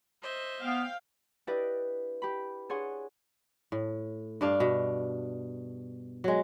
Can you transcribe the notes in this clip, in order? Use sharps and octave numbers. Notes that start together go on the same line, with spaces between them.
C5 D#5 E5
B3 F5 G5
D4 E4 G4 B4 D5 D#5
G4 B5
D4 G#4 C#5 F#5 C6 C#6
A2
G2 D4 F5
B2
F#3 G#3